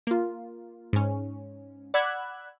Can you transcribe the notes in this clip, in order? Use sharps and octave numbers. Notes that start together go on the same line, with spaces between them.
A#3 F4
G#2 C#4
D5 F#5 B5 E6 F#6 G#6